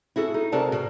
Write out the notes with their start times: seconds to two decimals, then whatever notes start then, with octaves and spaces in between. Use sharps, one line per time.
0.16 E4 F#4 G#4 A4
0.34 D#4
0.52 C3 F#4 G#4 A#4 D5 A5
0.72 B2